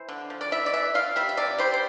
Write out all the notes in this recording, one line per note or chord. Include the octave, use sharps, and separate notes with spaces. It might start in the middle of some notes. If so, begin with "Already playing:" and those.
Already playing: E3 C5
D3
F3
D5
E4 E5
D5
E3 E5
F4 F5
G3 E5
E5
C3 D5
G3 C5
C5